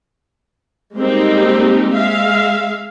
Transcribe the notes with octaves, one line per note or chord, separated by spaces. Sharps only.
G3 G#3 A#3 C4 D#4 G4
G#3 E5 F5